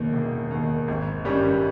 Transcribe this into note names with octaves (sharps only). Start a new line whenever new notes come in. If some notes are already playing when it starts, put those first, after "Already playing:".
Already playing: E1 D#2 D#3
E1
D#2 D#3
G#1
G2 D#3 G3 C#4